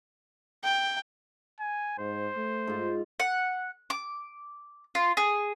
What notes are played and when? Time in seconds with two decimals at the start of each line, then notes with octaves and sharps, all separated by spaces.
0.64 G5
1.60 G#5
1.99 G#2 C5
2.37 A3
2.67 G#2 F4
3.20 F#5
3.90 D6
4.95 F4
5.17 G#4